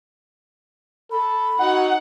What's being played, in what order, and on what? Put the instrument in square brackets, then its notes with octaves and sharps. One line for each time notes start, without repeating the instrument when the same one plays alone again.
[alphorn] A4 [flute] B5
[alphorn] D#4 [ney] F#4 [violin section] F#5